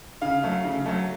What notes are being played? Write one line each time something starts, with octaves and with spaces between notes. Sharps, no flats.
C#3 F5
F#3 A3
C#3
F#3 A3